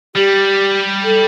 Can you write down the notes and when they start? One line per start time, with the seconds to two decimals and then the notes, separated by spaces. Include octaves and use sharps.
0.15 G3 G4
1.04 A4